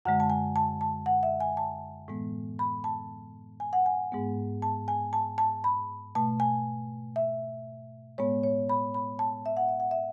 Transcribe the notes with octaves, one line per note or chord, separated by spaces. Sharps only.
F#2 D3 G#3 F#5
A5
G#5
A5
A5
F#5
E5
G#5
A5
A2 E3 G#3 B3
B5
A5
G#5
F#5
G#5
G#2 G#3 B3
A5
G#5
A5
A5
B5
B2 A3 A5
G#5
E5
A2 G#3 B3 C#5
C#5
B5
B5
A5
E5
F#5
E5
F#5
E5